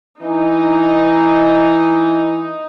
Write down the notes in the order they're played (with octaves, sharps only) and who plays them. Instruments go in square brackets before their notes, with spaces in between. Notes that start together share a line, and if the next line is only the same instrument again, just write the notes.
[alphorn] E3 [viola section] D#4